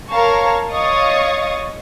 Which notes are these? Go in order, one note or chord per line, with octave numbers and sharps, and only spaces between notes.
A#4 C#5 F5 A5 A#5 C#6
C#5 D#5 F5 C#6 D#6 A6